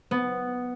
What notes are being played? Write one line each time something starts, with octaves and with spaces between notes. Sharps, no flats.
B3